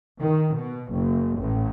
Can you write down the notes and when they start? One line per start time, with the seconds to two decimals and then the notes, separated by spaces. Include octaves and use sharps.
0.20 D#3
0.57 B2
0.91 F#1
1.37 A1